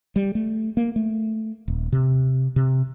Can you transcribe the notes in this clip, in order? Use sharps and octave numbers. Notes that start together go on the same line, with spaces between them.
G3
A3
A#3
A3
D#1
C3
C3